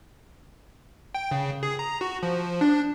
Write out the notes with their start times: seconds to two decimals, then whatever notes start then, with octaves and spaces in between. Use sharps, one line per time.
1.15 G5
1.31 C#3
1.63 G#4
1.79 A#5
2.01 F#4
2.23 F3
2.61 D4